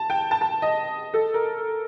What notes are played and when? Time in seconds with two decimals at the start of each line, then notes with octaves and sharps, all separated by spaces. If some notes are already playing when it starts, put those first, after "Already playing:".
Already playing: A5
0.10 G5
0.31 A5
0.41 A5
0.62 D#5
1.14 A4
1.34 A#4